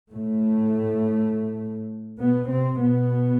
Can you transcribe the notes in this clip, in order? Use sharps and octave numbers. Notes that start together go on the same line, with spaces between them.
A2 A3
B2 B3
C3 C4
B2 B3